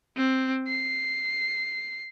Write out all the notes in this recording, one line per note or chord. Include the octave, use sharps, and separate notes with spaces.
C4
C7